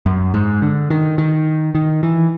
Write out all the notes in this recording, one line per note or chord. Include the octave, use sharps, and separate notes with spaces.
F#2
G#2
D3
D#3
D#3
D#3
E3